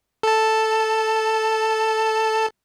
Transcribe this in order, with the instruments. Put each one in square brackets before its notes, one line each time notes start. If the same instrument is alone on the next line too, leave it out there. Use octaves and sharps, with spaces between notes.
[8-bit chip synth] A4 A5